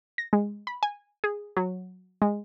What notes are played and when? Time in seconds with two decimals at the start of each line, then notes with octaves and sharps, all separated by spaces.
0.18 A#6
0.33 G#3
0.67 B5
0.83 G#5
1.24 G#4
1.57 F#3
2.22 G#3